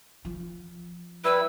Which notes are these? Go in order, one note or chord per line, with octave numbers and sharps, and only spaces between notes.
F3
G3 E4 B4 E6